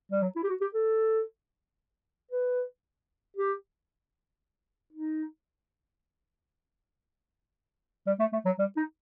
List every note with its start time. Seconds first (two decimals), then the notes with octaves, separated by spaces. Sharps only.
0.12 G3
0.23 F#3
0.36 E4
0.44 G4
0.49 F#4
0.61 G4
0.74 A4
2.31 B4
3.37 G4
4.93 D#4
8.07 G3
8.19 A3
8.33 A3
8.45 F#3
8.59 G3
8.77 D#4